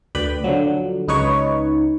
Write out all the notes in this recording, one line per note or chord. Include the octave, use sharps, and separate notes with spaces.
D2 B4 D5 G5 B5
D3 F3 F#3
C#2 D#4 B4 C#5 C#6